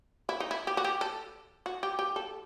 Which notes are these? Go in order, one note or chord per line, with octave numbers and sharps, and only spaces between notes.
E4
D#4
E4
G4
F#4
G4
A4
F#4
G4
G4
A4